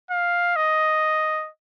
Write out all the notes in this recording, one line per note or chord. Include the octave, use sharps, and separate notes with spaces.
F5
D#5